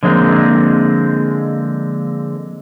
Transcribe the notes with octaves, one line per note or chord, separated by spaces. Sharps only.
D3 F3 G#3 A#3 C4